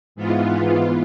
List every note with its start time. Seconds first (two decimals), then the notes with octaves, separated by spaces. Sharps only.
0.15 G#2 E3 B3 F4